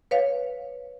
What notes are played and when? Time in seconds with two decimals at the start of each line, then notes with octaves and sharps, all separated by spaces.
0.11 B4 C#5 F5